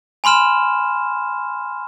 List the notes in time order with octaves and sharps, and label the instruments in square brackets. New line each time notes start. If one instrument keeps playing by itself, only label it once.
[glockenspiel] G#5 B5 C6 F6 E7